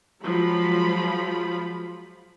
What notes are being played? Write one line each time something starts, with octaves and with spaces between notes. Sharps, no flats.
F3 F#3 G#3 F4 B5